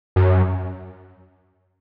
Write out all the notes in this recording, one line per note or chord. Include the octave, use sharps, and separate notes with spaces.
F#2